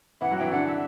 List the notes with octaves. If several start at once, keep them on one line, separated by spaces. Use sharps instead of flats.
E3 E4 F#5
F#3 F#4
E3 E4 G5
D3 D4 F#5
E5